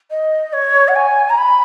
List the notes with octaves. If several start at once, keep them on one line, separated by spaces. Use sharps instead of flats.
D#5
C#5
F#5
G#5
A#5
B5